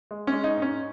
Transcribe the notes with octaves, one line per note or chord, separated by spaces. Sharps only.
G#3
C#4
G#3
D#4
G#2
C#4